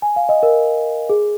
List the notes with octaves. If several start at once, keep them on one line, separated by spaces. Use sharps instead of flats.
G#5
F5
D#5
A#4
G#4